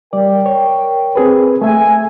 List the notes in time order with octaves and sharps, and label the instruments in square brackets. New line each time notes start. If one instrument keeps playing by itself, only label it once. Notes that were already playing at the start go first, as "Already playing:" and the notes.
[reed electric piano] G3 D5 [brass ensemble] A#4 G5
[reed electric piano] C#5
C4 G#4 B4
[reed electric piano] A3 E5 [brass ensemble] G#5